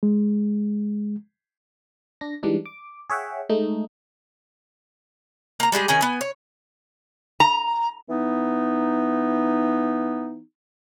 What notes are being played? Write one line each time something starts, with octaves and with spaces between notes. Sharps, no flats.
G#3
D4 A#6
E3 G3 G#3 D4 D#4
D6
G#4 C#5 E5 F#5 G5
G#3 A3 D#4
A#3 A#5
G3 G#3 G4 G#4
D#3 C#4 G#4 G#5
B3 G#5
C#5
A#5
E3 B3 D#4